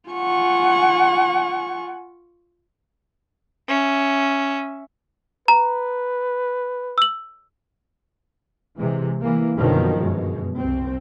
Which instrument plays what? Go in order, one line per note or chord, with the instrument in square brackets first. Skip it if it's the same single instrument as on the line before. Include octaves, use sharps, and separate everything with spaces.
[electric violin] F4 C#6 [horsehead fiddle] F#5 G#5
[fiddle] C#4 E5
[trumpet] B4 [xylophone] A#5
[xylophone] E6 F#7
[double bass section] C3 E3 G#3
E3 A#3
F#1 B2 D3 D#3 F3 F#3
G1 F#2 B2 G#3
C2 C4